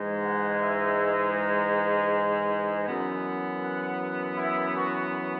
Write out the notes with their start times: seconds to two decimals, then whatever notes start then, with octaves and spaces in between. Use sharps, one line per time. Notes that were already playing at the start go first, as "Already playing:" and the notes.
Already playing: G#2 E3 G#3
0.24 F#5
0.62 E5
2.86 F#2 E3 B3
3.62 F#5
4.37 E4
4.75 F#4